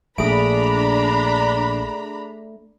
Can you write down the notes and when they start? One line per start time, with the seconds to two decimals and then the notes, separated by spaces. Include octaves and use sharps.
0.18 A#1 A3 D4 G#4 A#5 B5 D7